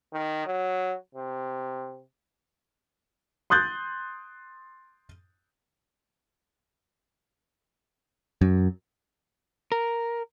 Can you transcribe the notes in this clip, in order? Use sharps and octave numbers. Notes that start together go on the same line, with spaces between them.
D#3
F#3
C3
C6 D#6 F#6 G6 A6
F#2
A#4